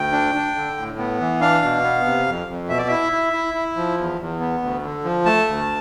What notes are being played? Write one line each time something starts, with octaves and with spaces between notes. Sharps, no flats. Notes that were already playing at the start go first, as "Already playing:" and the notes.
Already playing: D2 G5
D4
D4
D3
A2
B3
E3
D4 F5
B2
B3
C3
F2
F2
B2 E5
D5
E4 E5
E4
E4
E4
F3
E2
E2
B3
D2
D3
F3
A3 A5
D2